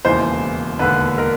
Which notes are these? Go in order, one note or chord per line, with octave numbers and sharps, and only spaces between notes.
E1 D#2 C#3 E3 C5
E1 D#2 D3 B4
A#4